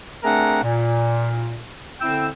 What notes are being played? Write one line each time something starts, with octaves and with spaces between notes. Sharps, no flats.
A3 C4 D4 G#4 A#4 F#5
A#2
D3 C4 E4 G5 E6